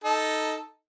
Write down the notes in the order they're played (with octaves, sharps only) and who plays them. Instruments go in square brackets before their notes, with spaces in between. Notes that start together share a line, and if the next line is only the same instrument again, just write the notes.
[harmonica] D#4 A4